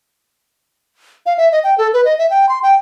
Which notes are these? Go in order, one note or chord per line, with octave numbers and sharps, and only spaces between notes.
F5
E5
D#5
G5
A4
B4
D#5
E5
G5
C6
G5